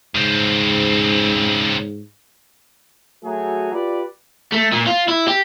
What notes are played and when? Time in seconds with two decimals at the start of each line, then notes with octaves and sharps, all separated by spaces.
0.15 G#2 C#3 C4
3.24 F#3 A3 F#4 G#4 G#5 A#5
3.73 F4 G4 B4 D5
4.52 A3
4.72 A#2
4.86 F4
5.08 E4
5.28 G4